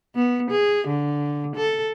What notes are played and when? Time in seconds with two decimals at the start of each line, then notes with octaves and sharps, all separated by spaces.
0.15 B3
0.50 G#4
0.87 D3
1.56 A4